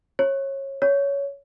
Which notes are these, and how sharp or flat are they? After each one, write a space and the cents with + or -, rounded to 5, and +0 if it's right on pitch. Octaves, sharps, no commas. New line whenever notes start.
C#5 -25
C#5 +15